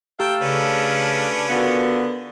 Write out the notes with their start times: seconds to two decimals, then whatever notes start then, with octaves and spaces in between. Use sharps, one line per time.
0.20 A3 G4 A4 F5 G5 A#5 E6
0.41 C#3 C#4 D4 B4
1.49 D3 B3 F4 F#4 A#4